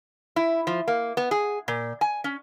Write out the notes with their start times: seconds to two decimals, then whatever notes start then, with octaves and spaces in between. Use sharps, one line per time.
0.36 E4
0.67 F3
0.88 A#3
1.17 B3
1.31 G#4
1.68 A#2
2.01 G#5
2.24 C#4